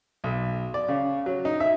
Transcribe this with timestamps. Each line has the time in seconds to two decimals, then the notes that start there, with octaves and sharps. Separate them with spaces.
0.24 B1
0.74 D5
0.89 C#3
1.26 F#3
1.45 D#4
1.60 E5